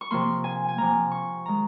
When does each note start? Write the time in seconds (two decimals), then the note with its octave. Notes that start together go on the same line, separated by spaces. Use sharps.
0.01 C#6
0.11 C3 F3 A#3 C6
0.44 G#5
0.69 G#5
0.78 C3 F3 A#3 A#5
1.12 C#6
1.46 D#3 G#3 A#5